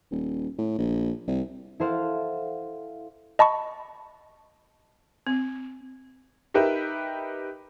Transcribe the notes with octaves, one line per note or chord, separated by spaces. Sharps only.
D#1
A2
A#1
C2
E4 A4 C5 F5 F#5
D#5 A5 B5 C#6
C4
D#4 G4 A#4 B4 E5